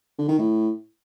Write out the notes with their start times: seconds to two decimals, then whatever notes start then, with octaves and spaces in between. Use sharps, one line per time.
0.18 D3
0.28 D#3
0.39 A2